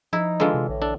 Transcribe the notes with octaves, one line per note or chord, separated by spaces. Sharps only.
F3 D#4 E4
D3 E3 G#3 F4
C3
A#1 A2
D4 A4